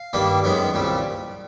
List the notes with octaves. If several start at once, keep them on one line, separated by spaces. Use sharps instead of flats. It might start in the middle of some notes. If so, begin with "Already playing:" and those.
Already playing: F5
G2 D#3 G3 A#3
F#2 D#3 G#3 B3
C2 A#2 G3